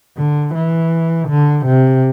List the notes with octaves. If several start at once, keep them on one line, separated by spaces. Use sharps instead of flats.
D3
E3
D3
C3